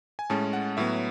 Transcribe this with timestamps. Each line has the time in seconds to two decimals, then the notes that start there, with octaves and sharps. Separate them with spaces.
0.19 G#5
0.30 A2 G#3 C#4 A5
0.53 F#5
0.77 A2 F#3 B3 E5